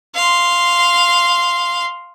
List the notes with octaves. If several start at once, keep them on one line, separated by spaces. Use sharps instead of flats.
F5 C6